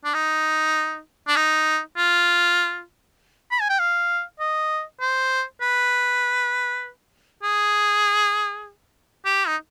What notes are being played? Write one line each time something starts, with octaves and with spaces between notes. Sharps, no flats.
D4
D#4
D4
D#4
F4
B5
G#5
G5
F5
D#5
C5
B4
G#4
G4
D#4